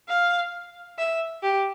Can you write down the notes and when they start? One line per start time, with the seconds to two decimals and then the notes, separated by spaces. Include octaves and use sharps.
0.09 F5
0.98 E5
1.43 G4